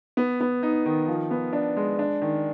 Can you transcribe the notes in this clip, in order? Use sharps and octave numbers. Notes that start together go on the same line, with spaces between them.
B3
B3
D#4
D#3
F3
B3
D4
G#3
D4
D#3